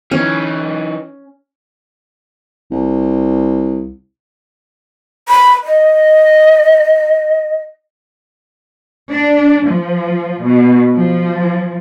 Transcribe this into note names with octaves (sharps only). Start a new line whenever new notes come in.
E3 C#4 D#4
C2
B5
D#5
D4
F3
B2
F3